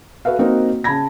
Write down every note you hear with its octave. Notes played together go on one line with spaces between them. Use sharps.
F#4 A4 B4 E5 F5
A#3 C4 D#4 F#4 A#4
C#3 A5 B5 G#6 A#6